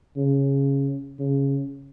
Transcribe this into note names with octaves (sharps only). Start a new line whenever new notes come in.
C#3
C#3